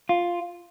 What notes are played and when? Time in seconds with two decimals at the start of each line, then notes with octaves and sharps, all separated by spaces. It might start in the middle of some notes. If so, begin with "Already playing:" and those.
0.09 F4